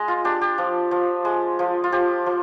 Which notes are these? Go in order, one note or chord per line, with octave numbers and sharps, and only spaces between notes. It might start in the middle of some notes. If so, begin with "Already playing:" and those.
Already playing: G#3 D#5
F4
D4 G4
G4
F3
F3
G#3
F3
F4
F3 G4
F3